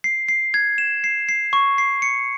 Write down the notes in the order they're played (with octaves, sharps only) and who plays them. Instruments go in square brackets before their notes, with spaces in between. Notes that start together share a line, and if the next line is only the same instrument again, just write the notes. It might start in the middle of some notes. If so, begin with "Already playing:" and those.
[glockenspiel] C7
C7
G#6
E7
C7
C7
C#6
C7
C#7